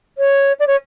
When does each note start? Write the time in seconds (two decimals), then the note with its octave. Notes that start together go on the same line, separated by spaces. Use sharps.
0.18 C#5
0.59 D5
0.67 C#5